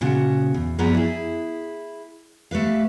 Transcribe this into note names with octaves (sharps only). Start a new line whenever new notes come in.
A#2 C#3 F#4
E2
F#2 F3 B3 G#4 D5 A#5
E4 G#4
A3 G4 B4 F5